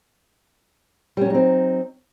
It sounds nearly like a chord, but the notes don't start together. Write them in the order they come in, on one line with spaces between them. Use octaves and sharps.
G3 C#4 F#3 D#4 C4